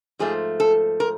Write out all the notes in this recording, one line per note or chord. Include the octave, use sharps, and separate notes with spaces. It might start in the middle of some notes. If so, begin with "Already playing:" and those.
G#2 F3 A3 G#4
A4
A#4